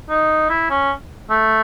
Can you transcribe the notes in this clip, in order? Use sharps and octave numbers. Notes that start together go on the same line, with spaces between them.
D#4
E4
C#4
A3